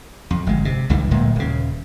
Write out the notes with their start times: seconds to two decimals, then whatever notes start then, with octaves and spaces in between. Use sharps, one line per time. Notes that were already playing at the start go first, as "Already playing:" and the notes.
0.31 F2
0.47 G1 G#3
0.65 C3
0.90 C#2 G2 E3
1.11 D1 A#2 G#3
1.36 D#1 C#3